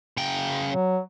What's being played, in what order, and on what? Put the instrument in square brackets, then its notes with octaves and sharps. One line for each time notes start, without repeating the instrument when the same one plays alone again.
[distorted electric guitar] C#3 G5
[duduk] F#3